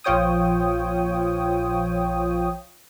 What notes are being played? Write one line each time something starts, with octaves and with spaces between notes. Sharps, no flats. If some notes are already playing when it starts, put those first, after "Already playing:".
A#1 F3 F4 C#5 G5 D#6